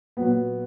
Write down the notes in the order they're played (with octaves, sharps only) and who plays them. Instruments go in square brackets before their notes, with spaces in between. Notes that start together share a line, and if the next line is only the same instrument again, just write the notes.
[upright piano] A#2 F#3 B3